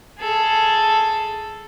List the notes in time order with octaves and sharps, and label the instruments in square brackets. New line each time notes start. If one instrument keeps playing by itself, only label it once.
[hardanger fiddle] G#4 A4